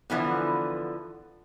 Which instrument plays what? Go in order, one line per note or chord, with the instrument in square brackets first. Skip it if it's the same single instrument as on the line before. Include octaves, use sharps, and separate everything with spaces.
[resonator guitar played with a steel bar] D3 E3 F3 B3